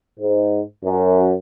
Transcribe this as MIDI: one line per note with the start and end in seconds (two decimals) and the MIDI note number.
0.19 0.60 44
0.84 1.32 42